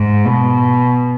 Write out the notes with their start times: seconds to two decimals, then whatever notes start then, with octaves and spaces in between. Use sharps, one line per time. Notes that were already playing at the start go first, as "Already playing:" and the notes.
Already playing: G#2
0.26 B2